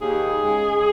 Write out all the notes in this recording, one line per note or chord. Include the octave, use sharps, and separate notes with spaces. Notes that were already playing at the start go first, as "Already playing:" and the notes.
D#2 G#4
C#3 G#3